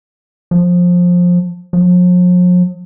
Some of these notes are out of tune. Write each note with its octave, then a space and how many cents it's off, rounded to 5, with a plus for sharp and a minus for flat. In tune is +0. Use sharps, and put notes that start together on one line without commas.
F3 +20
F3 +45